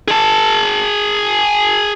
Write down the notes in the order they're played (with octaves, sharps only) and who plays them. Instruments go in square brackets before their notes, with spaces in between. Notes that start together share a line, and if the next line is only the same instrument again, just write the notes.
[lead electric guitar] G#4 A5